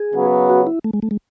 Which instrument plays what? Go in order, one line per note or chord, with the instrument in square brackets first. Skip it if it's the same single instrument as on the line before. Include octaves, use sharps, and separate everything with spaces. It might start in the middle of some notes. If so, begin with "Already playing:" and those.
Already playing: [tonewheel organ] G#4
[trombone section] C#3 F#3 B3
[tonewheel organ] F#4
E4
A3
G#3
A3
G#3